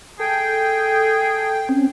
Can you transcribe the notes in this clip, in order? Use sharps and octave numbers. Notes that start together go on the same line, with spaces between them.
G#4 A4 G5
C4 C#4